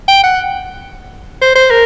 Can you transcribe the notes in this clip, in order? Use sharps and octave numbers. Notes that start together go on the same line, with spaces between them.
G5
F#5
C5
C5
A#4